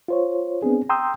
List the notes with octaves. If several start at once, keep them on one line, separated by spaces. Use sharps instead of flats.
F4 C5 C#5
B3 C4 D4 G#4
G5 A#5 C6 D#6 E6 G6